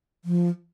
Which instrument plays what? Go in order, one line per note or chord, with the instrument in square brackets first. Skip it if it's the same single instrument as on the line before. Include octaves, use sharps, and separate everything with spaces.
[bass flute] F3